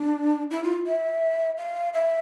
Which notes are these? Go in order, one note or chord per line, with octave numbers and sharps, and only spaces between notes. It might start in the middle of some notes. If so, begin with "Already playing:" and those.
Already playing: D4
E4
F4
E5
F5
E5